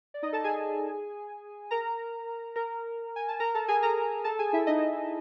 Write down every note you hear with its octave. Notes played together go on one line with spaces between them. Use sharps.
D5
D#4 D#5
A4 A5
G#4 G#5
A#4 A#5
A#4 A#5
G#5
A5
A#4 A#5
A4 A5
G#4 G#5
A#4 A#5
A4 A5
G#4 G#5
E4 E5
D#4 D#5